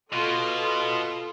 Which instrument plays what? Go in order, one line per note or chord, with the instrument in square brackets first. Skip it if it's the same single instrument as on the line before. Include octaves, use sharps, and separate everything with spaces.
[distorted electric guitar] B2 [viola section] F4 A4